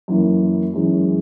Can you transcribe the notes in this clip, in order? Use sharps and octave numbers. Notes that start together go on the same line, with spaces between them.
F#2 E3 A#3 E4
F#2 E3 G#3 C#4